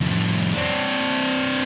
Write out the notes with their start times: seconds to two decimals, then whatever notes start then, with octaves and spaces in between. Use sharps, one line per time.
0.01 F2 A2
0.55 C4 D4